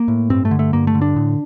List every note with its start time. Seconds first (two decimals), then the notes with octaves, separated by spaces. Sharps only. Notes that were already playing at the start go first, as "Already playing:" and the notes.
Already playing: A#3
0.08 A2
0.30 G2 C4
0.45 A3
0.51 D3
0.59 A3
0.73 G2 A#3
0.87 A3
0.95 D3
1.02 D4
1.16 A2